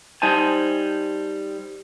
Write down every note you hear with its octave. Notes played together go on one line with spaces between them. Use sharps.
G3 D#4 C5 G#5 A5